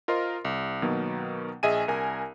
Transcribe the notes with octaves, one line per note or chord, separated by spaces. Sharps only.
F4 A#4 C5 D#5 C6
C2
B2 D#3 F#3 A#3 B3
A#1 G#4 D#5 E5 G#5 D#7
C2 A#4 G#5